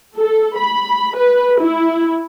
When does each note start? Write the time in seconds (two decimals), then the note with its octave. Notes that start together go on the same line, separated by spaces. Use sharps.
0.17 A4
0.57 B5
1.16 B4
1.60 E4